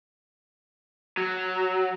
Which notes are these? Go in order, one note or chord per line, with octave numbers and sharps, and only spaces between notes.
F#3